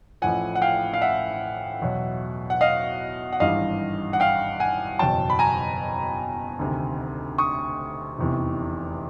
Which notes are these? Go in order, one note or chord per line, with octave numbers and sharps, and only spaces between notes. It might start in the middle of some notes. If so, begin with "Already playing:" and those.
A1 A2 F3 F#5 G#5
F#5
F5 G5
F5
E5 F#5
E2 B2 F#3
F#5
D#5 F5
F#5
G#1 G2 E3 G3 D#5 F5
F#5
F5 G5
F#5 G#5
F#1 E2 B2 F#3 G5 A5
B5
G#5 A#5
D2 C3 D#3
C#6 D#6
F1 E2 C3 E3